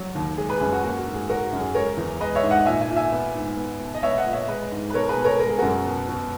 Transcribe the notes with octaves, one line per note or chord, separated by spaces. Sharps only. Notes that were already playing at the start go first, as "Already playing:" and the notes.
Already playing: F#3
D#2
G#3 G#4
G#4 B4
F#2 G#4
F#4
A#3 F#4
F#4
G#2
G#4
G#3 F#4 A#4
F#4
F#2
G#4
G#3 A#4 C#5
E2
G#3 B4 D#5
C#5 E5
G#2
D#5 F#5
A#2 E5 G#5
E5 G#5
A#2
E5 G#5
B3
G#2
B3
B2
D#5
B3 C#5 E5
D#5 F#5
A#2
C#5 E5
G#3 B4 D#5
G#2
B4
B2 A#4 C#5
G#4 B4
B2
A#4 C#5
G#3 A#4
G#4
F#2 F#4 A#4
B2
B2